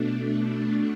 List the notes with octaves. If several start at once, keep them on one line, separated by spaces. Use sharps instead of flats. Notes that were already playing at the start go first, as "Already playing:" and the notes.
Already playing: B2 A3 D4